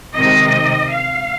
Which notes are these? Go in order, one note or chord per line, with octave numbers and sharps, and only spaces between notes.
C3 D#3 G#3 D#5
F5